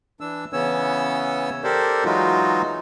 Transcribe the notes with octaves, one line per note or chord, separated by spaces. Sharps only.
E3 D4 E6
C#3 E3 B3 C#4 C#5 E6
G4 A4 A#4 C5 D5
E3 F#3 G#3 D#4 F4 F#4